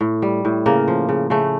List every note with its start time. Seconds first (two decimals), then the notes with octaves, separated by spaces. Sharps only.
0.01 A2
0.22 G3
0.45 A2
0.66 C#3 A#3
0.88 F3
1.09 C#3
1.30 C#3 A3